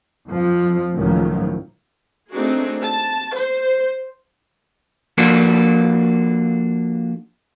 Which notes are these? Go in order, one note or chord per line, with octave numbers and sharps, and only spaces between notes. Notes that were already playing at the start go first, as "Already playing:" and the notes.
F2 F3
C#2 A2 D#3 F3 F#3
A3 C4 D4 D#4 F#4 G#4
A5
C5
F3 A#3 D4 F#4 A4